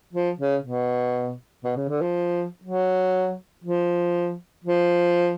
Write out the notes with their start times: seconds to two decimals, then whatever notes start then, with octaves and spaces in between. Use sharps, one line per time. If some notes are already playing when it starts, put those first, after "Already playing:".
0.13 F3
0.39 C#3
0.64 B2
1.64 B2
1.76 C#3
1.89 D3
2.01 F3
2.64 F#3
3.64 F3
4.65 F3